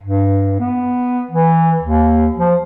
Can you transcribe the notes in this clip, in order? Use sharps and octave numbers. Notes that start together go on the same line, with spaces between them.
G2
B3
E3
D#2
F3